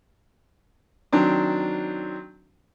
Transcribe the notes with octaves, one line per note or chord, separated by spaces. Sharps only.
D#3 F#3 C4 D4